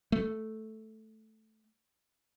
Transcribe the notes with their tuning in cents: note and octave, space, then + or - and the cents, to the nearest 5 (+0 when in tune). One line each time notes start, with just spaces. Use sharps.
A3 -5